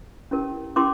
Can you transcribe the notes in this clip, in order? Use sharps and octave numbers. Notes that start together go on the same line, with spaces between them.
C#4 E4 G4 A#4
C#4 E4 G4 A#4 C6 D6